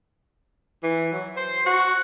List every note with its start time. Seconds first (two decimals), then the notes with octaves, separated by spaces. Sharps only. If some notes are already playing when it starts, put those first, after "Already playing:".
0.83 E3
1.12 F#3
1.37 C5
1.66 F#4